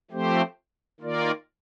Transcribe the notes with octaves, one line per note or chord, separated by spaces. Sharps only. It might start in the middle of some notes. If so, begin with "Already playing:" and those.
F3 A3 C4 G4 C5
D#3 A#3 F4 A#4 D5